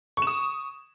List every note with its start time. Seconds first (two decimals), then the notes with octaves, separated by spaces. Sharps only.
0.17 C#6
0.22 E7
0.27 D#6